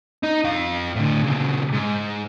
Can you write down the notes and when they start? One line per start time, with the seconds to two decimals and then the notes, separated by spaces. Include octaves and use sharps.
0.23 D#4
0.45 F2 F5
0.96 A2 D3
1.24 A#2 C#3
1.72 G#2